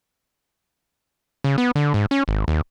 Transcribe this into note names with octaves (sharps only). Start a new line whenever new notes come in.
C#3
B3
D3
G#2
C#4
G#1
D#2